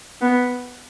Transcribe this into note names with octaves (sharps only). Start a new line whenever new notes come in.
B3